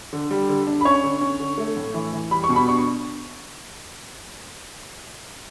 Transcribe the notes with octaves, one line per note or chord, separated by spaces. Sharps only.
D3
G3
D3
D4
B5
C#4 C#5 C#6
D3
C#4
D3
A3
A2
E3
E3
G3 B5
C#6
B2
B5
D4 C#6